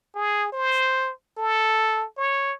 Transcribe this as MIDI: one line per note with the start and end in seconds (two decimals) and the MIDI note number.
0.15 0.51 68
0.53 1.11 72
1.38 2.06 69
2.17 2.53 73